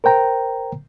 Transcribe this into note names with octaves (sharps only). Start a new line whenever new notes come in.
A#4 C5 G5 A#5